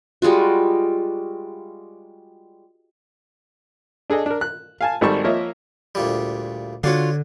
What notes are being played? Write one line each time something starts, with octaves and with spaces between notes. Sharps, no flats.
G3 G#3 F4 F#4
D4 G#4 A4 D#5
D4 A#4
F#6
F5 G#5 A5
G#1 D#3 G3 A4 A5 C#6
F3 A#3 A#4 C#5 D#5 E5
D2 A#2 G3
D3 D4 F4 F#4 C#5 F5